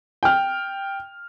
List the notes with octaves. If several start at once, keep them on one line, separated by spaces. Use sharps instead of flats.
G5 F6